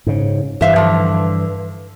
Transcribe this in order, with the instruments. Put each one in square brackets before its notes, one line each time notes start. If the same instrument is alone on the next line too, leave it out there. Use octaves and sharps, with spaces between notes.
[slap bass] G#2 C#3
[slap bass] G2 E3 [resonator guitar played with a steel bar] C5 E5 F5
[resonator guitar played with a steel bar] D3 F3